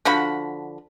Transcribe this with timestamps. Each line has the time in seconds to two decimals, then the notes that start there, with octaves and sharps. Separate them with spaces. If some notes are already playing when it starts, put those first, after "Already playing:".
0.05 D3 F3 F#4 B5